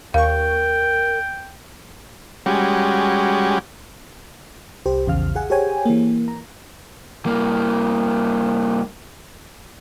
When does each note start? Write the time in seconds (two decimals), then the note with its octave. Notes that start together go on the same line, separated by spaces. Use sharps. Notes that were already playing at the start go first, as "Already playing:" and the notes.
0.14 D#2 A#4 F5 G5 C#6
2.46 G3 G#3 C#4 F#4 G4
4.86 C2 G4 C5
5.07 A#1 E2 C#3 F5 F6
5.35 G#4 F#5 G#5
5.50 G4 G#4 C5 C#5 G5 G#5
5.85 E3 A#3
6.28 A#5
7.26 G2 A#3